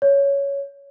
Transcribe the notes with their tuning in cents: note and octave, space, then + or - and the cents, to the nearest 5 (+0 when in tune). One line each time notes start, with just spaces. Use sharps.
C#5 +10